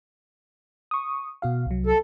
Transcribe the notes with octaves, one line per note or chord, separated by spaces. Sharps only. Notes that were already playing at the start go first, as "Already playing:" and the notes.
C#6 D#6
B2 F#4 F5
C2 F#3
A4